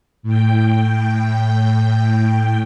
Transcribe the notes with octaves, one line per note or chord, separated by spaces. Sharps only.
A2 G5